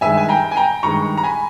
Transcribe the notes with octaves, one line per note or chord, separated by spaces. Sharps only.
G2 D#3 G#3 E5 G#5
G#5
G5 A#5
G#5
G5 A#5
G2 D#3 G#3 A#5 C#6
A#5
G#5 B5